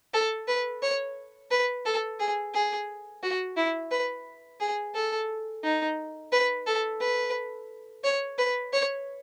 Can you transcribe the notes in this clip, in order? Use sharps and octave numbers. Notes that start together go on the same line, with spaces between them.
A4
B4
C#5
B4
A4
G#4
G#4
F#4
E4
B4
G#4
A4
D#4
B4
A4
B4
C#5
B4
C#5